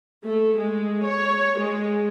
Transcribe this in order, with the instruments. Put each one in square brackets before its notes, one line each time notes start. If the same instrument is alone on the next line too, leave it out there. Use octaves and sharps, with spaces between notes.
[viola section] A3
G#3
C#5
G#3